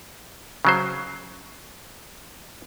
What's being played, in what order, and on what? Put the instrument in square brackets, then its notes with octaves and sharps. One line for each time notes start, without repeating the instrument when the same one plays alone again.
[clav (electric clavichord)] C#3 F#3 C5